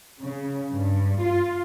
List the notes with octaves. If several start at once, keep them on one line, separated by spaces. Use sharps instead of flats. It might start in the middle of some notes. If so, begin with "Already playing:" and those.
C#3
G2
F4